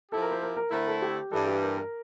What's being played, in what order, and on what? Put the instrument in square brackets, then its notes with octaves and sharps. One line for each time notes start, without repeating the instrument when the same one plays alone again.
[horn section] F3 C4 E4 G4 [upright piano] A4
[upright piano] A#4
C5
A#4
A#4
[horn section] D3 A3 C4 E4 [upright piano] A#4
[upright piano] A4
G4
[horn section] G2 E3 G3 [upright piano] A4
[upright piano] G4
A#4
A#4